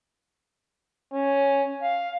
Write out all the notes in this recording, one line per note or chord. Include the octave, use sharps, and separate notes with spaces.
C#4
F5